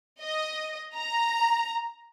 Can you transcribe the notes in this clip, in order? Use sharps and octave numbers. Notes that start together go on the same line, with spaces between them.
D#5
A#5